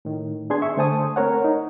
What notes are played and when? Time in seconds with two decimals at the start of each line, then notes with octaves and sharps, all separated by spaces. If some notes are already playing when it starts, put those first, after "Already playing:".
0.05 A2 D#3
0.50 B3 D4 G#4 C6 G#6
0.62 E5 C#6
0.77 D3 A3 C5 G#5 A5 D#6
1.16 A3 C4 A#4 C#5 F#5
1.44 D#4